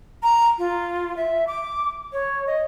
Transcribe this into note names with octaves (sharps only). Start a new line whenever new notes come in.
A#5
F4
E5
D6
C#5
D#5